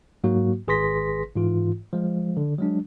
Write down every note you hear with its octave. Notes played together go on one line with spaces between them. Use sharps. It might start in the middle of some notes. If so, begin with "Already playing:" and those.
G#2 F#3 A#3 F#4
G#1 G#4 B4 C6 A#6 B6
G#2 E3 F4
F3 G#3
D3
F#3 G#3 D4